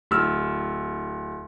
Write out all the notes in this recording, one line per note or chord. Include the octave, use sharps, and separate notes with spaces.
D1 E6 F6